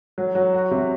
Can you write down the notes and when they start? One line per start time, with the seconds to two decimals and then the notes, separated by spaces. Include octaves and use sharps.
0.18 F#3
0.35 F#3
0.54 F#4
0.71 C3